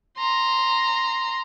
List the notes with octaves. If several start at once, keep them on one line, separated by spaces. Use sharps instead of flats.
A#5 C6